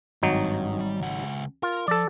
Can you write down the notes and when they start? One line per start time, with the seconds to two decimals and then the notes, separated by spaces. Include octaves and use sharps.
0.23 G#1 G2 F#3 D#4
0.80 G3
1.01 C#2 F#5
1.63 F4 A#4
1.88 F3 A4 D5